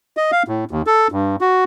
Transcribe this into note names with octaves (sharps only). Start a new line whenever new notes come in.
D#5
F5
A2
D#2
A4
G2
F#4